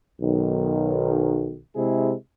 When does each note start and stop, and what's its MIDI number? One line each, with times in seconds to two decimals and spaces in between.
0.21 1.59 35
0.21 1.59 51
1.75 2.13 48
1.75 2.13 56
1.75 2.13 64
1.75 2.13 68